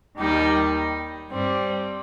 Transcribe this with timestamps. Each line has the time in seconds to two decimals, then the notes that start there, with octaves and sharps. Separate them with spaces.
0.18 D#2 D#3 G3 D#4 G4
1.31 G2 G3 C4